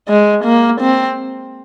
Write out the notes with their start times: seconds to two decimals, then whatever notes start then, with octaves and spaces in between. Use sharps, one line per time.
0.08 G#3
0.44 A#3
0.80 C4